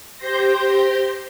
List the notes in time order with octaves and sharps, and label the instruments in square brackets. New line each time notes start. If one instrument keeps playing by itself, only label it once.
[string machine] G4 C5 C6 G6 A#6